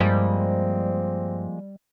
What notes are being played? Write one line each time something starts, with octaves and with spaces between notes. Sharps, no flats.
G2 F3 G3 G#3 A#3 C4